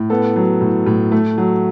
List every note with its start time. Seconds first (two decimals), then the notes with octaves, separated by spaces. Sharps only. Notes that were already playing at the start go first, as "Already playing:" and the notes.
Already playing: A2
0.10 B3 A4
0.36 F#3
0.61 A2
0.86 A2
1.12 A3
1.38 F#3